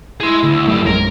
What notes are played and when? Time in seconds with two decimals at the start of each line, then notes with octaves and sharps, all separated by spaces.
0.20 E4 G#4 C6
0.44 D2
0.67 F#2 A3 G4
0.86 A#1 F#2 G#3 A#4